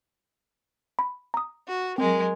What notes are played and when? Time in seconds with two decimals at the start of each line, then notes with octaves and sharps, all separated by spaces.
0.99 B5
1.34 A#5 D#6
1.68 F#4
1.98 F#3 G#3 C4 A#4